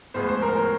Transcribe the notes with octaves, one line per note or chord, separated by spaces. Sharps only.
A2 F3 G#3 B3 C5
C5
A#4
A#4